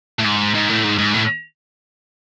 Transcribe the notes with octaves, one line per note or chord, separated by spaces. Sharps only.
A2
G#2
G#2
A2
G#2
G#2
A2